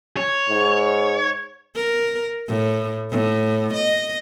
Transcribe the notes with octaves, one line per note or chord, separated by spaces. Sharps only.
C#5
G#2
A#4
A2
A2
D#5